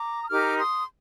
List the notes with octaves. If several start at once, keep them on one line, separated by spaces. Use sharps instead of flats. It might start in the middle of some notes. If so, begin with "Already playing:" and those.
Already playing: A#5 D6
D#6
D#4 G4 A#4 D6 F6
C6 D#6